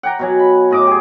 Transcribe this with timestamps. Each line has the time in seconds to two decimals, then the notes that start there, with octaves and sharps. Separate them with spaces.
0.03 F#5 G5 A#5
0.19 B2 F#3 G#5
0.39 B5
0.71 A2 D#5 D6
0.87 G4 G#4